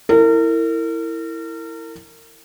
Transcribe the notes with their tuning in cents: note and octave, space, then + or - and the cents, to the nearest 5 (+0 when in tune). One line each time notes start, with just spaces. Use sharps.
E4 +0 A#4 -35